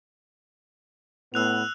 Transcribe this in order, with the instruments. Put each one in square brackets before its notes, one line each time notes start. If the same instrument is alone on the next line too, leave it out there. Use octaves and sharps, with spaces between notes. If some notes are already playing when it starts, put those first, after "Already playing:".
[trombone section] A2 B3 [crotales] E6 F#6 F7